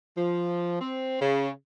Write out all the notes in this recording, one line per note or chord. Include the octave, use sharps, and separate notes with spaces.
F3
C4
C#3